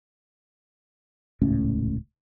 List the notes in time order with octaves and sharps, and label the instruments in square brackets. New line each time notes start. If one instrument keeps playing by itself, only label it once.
[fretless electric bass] D#1 C#2 A2 C#4